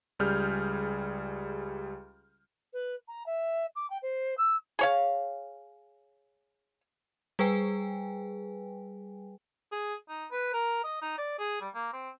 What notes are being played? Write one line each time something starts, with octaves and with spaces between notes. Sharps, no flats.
C#2 G3 G#4 F6 G6
B4
A#5
E5
D6
G5
C5
E6
G#4 C#5 F5
G3 G#4 B4 G5 G#5
G#4
D#4
B4
A#4
D#5
D#4
D5
G#4
G3
A#3
C4